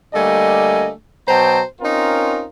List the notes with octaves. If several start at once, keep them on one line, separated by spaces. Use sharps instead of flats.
D3 G3 A3 A#3 D#5 G#5
B2 F#3 C5 G5 A5 A#5
C4 C#4 D#4 F4 A#4